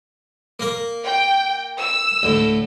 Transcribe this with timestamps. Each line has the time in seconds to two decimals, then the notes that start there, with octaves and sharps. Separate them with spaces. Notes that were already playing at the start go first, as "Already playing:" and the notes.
0.60 A#3 A#4
1.04 G5
1.79 E6
2.23 D2 A2